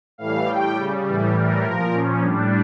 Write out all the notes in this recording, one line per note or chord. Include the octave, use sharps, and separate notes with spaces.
A2 E3 G3 F5
A2 G3 G5
C#3 G3
A2 E3 G3
A2 E3 G3 A#4
A#2 F3 A#4
A#2 F3 C#4
A2 G3 D4